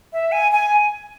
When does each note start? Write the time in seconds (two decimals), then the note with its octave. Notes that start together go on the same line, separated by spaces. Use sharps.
0.13 E5
0.32 G#5
0.52 G#5